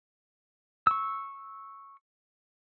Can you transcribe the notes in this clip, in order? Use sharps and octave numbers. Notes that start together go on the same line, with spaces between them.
C#6 E6